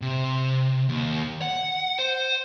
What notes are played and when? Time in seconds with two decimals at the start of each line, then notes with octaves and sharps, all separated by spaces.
0.02 C3
0.89 D#2
1.42 F#5
1.99 C5